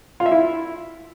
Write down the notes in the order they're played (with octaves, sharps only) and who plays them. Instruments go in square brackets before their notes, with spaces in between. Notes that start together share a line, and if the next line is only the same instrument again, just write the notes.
[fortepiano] F4
E5
E4